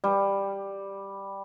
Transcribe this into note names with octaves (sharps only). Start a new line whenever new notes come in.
G3